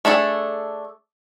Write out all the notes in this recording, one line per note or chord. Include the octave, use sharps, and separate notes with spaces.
A3 D4 G#4 A4